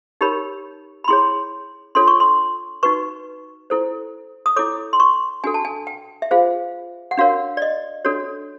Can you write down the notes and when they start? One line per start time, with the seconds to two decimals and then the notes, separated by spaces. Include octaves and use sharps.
0.21 D#4 G4 A#4 C#5 B5
1.04 B5
1.08 E4 G#4 C#5 C6
1.95 D4 F4 A4 C#5 C6
2.08 C#6
2.20 C6
2.83 D#4 F#4 B4 C#6
3.70 E4 A4 C5
4.46 D#6
4.56 E4 A4 C#5 D6
4.93 C6
5.00 C#6
5.44 D4 F#4 A4 G#5
5.54 A5
5.65 G#5
5.87 G5
6.22 E5
6.31 F4 G#4 C5 F5
7.11 F#5
7.17 D4 F#4 A#4 C#5 F5
7.57 D5
7.62 D#5
8.05 D4 F#4 A4 C#5